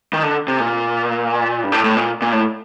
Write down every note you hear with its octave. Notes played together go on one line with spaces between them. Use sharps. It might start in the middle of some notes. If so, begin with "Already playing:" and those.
D#3
D3
C3
A#2
G2
A2
A2
A#2
A#2
A2